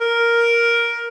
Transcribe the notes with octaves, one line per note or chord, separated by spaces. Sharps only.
A#4